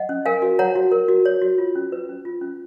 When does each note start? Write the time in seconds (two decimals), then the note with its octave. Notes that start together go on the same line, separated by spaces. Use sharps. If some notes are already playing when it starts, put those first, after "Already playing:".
Already playing: D#5 F#5
0.09 C#4
0.25 A#4 F5 G#5
0.42 F#4
0.59 C#5 F#5 A#5
0.75 F#4
0.92 A#4
1.08 F#4
1.25 C#5
1.42 F#4
1.58 F4
1.75 C#4
1.92 B4
2.09 C#4
2.25 F4
2.41 C#4